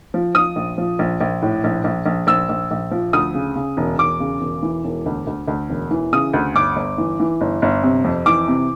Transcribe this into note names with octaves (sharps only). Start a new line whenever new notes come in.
F3
F3 D#6
A#1
F3
A#1
A#1
A2
A#1
A#1
A#1
A#1 E6
A#1
A#1
F3
D2 D#6
C#3
C#3
E1
E1 D6
C#3
E1
E3
E1
D2
D2
D2
E1
E3
C#3 D#6
D2
G1 D6
G1
E3
E3
G1
G1
C3
F2
E3 D6
C3